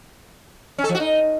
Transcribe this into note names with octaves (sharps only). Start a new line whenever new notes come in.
C#4
A4
F3
F#4
D#4